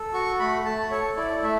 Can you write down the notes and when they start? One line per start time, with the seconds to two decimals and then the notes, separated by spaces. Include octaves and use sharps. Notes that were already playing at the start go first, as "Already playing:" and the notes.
Already playing: A4
0.13 F#4 C#6
0.39 A3 B5
0.65 A3 A5
0.91 A4 C#5
1.17 E4 D5
1.42 A3 E5